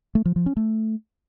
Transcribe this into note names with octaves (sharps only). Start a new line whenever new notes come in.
A3
F3
F3
C#4
A3